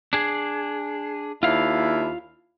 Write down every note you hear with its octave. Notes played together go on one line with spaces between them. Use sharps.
D4 G#4
D#2 D4 E4 F4 F5